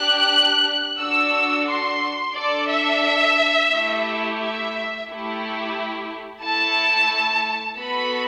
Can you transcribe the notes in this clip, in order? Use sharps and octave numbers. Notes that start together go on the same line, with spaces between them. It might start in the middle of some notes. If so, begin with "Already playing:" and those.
Already playing: D4 G4 F#6
D4 F#4 A4 E6
C6
D4 A4 D5
E5
A3 E4 G4
E5
A3 E4 G4
A3 E4 A4 A5
B3 F#4 A4 B5